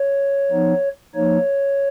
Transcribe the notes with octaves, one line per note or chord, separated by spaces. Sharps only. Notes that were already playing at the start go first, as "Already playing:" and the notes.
Already playing: C#5
F3 B3 D#4
F3 A#3 D#4 C#5